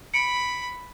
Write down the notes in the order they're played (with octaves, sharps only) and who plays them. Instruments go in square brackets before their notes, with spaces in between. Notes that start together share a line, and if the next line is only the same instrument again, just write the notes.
[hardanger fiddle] B5 [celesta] C#7 D7